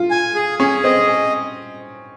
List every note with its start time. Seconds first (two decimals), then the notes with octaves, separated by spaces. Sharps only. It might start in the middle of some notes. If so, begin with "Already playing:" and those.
Already playing: F4
0.10 G#5
0.35 G#4
0.59 C#4 G#4
0.84 C4 D#5